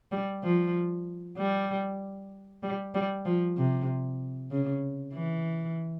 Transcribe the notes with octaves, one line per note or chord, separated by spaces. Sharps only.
G3
F3
G3
G3
G3
F3
C3
C#3
E3